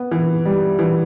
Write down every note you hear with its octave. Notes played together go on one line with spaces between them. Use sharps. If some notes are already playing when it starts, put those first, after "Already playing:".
Already playing: B3
E3
G3
E3